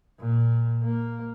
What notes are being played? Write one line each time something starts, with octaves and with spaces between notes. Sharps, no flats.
A#2
A#3